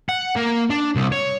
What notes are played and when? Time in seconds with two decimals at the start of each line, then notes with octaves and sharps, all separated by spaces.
0.09 F#5
0.36 A#3
0.70 D4
0.96 C2
1.12 C#5